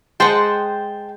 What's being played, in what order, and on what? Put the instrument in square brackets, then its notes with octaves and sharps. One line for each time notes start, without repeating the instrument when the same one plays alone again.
[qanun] G#3 D#5 F#5 [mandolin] C5 G5 A5